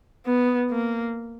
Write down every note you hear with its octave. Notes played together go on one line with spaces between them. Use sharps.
B3
A#3